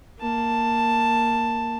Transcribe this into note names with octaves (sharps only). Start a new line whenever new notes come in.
A#3 A5